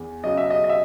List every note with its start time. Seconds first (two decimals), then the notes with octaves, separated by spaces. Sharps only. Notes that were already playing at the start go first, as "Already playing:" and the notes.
Already playing: E2
0.24 C#3 F#3 D#5
0.37 E5
0.50 D#5
0.64 D#5
0.69 E5